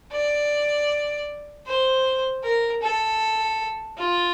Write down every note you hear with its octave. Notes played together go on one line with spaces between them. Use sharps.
D5
C5
A#4
A4
F4